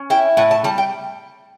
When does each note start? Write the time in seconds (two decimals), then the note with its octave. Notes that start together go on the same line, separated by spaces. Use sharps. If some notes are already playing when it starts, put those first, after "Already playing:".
Already playing: C#4
0.10 E4 G5
0.37 A2 F#5
0.51 A5
0.64 G3 A5
0.78 G5